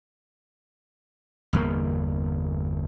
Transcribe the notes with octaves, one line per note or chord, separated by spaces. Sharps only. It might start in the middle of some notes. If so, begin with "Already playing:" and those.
G1 E2 A#3